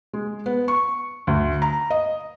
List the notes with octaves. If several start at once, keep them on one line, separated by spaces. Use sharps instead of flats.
G#3
B3
C#6
D2
A#5
D#5